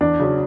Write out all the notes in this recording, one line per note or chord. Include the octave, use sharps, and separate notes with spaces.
E2 D4
C#3 F#3 C#4